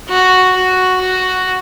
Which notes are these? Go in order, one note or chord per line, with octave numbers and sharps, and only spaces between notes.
F#4
F#4
F#4